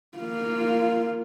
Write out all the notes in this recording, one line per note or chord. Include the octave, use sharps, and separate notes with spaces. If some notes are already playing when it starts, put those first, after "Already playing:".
A#3 F4